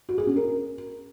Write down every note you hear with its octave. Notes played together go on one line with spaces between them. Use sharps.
F#4
G#4
C#4
A#4